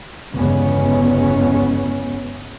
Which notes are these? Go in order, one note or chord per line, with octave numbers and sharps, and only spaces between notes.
G1 E2 C#3 G#3 B3 C#4